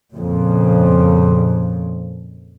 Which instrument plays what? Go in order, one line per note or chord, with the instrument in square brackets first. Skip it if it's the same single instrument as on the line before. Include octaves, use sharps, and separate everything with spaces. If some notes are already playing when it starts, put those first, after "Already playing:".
[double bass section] F2 A#2 C#3